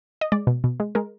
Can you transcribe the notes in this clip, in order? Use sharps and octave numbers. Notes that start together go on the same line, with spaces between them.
D#5
G#3 D5
B2
B2
G#3
G#3 A#4